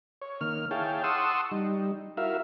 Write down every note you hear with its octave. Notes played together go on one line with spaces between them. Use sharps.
C#5
D#3 A#3 F6
E4 G#4 C#5 F5 G5 A5
F#5 A5 C6 C#6 D#6 E6
G3 D#4
E4 F#4 A#4 E5 F5